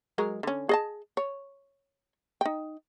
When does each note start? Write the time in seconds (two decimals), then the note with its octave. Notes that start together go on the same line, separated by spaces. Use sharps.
0.18 F#3 G#3 A#4
0.43 D3 C#4
0.69 G#4 D#5 A5
1.17 C#5
2.41 D#4 G5